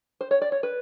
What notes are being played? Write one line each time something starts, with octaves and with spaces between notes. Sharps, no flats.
C5
C#5
D5
C#5
B4